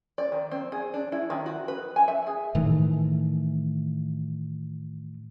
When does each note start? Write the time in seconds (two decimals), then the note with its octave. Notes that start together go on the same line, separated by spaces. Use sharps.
0.18 D5
0.32 D#3
0.51 C4
0.72 G#4
0.94 D4
1.12 E4
1.30 D#3
1.46 F#4
1.68 B4
1.96 G#5
2.08 E5
2.27 G#4
2.55 A2 D#3 E3 A3